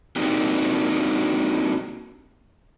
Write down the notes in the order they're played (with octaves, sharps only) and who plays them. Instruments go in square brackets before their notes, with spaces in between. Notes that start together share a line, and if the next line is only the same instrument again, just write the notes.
[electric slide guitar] A#3 C4 D4 D#4 F#4 G4